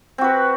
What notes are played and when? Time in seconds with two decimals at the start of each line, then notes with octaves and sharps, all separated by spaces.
0.18 C4
0.21 F#4
0.24 B4